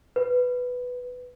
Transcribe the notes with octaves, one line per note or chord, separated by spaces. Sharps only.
B4